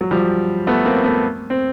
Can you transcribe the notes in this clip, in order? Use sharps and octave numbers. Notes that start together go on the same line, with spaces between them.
F#3
F3 G3
A3 B3
A#3 C4
A3 B3
C4